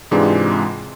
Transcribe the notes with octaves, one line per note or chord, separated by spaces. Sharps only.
G#2 C3 E3 G#3 D4 F4